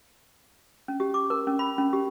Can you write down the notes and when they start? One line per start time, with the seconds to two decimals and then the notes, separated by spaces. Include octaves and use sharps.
0.88 C#4
1.00 G4
1.14 D6
1.30 A#4
1.47 C#4
1.59 B5
1.78 C#4
1.93 G4